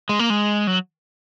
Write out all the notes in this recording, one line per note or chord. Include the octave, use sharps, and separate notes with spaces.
G#3
A#3
G#3
F#3